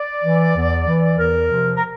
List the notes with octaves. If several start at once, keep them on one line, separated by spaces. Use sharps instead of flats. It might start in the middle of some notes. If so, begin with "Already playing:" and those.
Already playing: D5
E3
E2
E3
E2 A#4
C3 F3
A#4